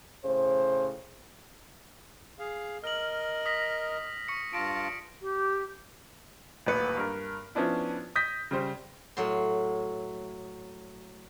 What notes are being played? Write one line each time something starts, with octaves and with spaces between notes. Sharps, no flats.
A2 C#3 C5
G#4 F5
A#4 D#5 F6 F#7
D#6 A#6 B6
C#6 C#7
G2 F4 A5 A#6 D7
G4
D#1 A1 B4 C#7
G2 A#4
F3 B3 C#4 D4 E4
D#6 G6 A#6 B6
C#3 G3 C5
A2 F#3 C6